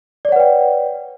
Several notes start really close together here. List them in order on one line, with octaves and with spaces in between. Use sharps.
D5 C#5 F#5 B4 G5